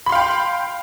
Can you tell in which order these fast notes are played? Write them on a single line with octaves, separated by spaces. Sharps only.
B5 C6 F5 G5